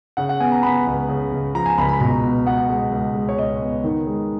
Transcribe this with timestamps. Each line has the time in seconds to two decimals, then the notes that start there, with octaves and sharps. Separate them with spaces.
0.17 C#3 F#5
0.29 F#5
0.40 B3 G#5
0.52 A#5
0.63 B3 B5
0.87 C#2
1.09 C#3
1.33 C#2
1.54 F3 A#5
1.66 G#5
1.78 C#2 B5
1.89 B5
2.00 B2 A#5
2.24 B3
2.46 B3 F#5
2.69 G#3
2.92 C#2
3.15 G#3
3.29 C#5
3.38 C#2 D#5
3.61 B3
3.84 D#3
4.07 G#3